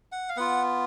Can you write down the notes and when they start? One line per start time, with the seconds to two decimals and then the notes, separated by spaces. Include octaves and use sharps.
0.12 F#5
0.29 F5
0.37 B3 F4 F#5